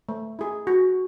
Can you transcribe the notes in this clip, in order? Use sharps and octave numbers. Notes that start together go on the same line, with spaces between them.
A3
E4 G#4
F#4